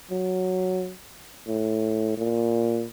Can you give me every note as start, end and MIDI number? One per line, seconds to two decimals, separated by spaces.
0.11 0.93 54
1.47 2.13 45
2.18 2.86 46